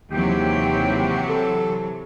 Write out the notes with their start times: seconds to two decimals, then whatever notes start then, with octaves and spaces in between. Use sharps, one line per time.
0.11 D#2 C3 E3 F#3 G#3 G4 G5
1.29 A4